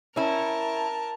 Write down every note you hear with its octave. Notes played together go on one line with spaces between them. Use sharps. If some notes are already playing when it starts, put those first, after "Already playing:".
C#4 E4 A#4 A5